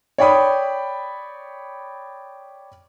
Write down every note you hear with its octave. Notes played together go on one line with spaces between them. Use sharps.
C#5 D5 G5 B5 D#6